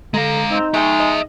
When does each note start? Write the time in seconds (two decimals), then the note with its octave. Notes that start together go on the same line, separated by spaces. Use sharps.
0.14 D3 G#3 F5 A#5
0.51 C4 D#4
0.74 G#3 G#4 E5 G5 C#6
1.00 D#5